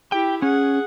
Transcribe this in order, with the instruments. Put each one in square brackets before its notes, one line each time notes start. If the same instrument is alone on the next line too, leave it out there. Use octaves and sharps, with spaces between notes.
[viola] E4 G4 [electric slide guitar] G5
[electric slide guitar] C#4 [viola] G#4 F#5